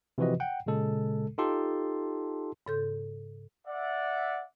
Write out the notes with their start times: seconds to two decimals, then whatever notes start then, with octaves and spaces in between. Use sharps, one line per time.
0.18 C3 E3 F3 F#4 B4 D#5
0.40 F#5 G5
0.66 A#2 C#3 G#3 A4
1.38 D#4 F4 G4 A4 A5 C6
2.66 G#2 C#3 A4 C6 G6
3.67 D5 E5 F#5